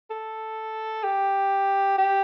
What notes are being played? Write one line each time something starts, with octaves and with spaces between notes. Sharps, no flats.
A4
G4
G4